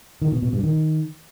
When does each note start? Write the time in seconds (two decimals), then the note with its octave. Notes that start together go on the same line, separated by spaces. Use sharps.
0.22 D#3
0.32 B2
0.42 B2
0.53 G2
0.63 D#3